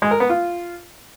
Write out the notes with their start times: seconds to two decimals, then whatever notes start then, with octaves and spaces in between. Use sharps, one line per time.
0.02 G#3
0.11 A#4
0.20 B3
0.29 F4